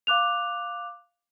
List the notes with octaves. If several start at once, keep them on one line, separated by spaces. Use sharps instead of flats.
F5 D6 F#6 F7